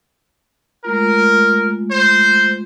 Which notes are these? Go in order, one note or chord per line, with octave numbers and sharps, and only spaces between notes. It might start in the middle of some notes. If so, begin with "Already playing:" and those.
G#3 A3 F4 A#4
C5